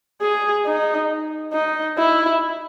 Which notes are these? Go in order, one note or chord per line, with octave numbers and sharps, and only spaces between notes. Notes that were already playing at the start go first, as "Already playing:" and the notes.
G#4
D#4
D#4
E4